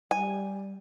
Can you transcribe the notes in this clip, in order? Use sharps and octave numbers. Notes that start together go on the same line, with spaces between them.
G3 G#5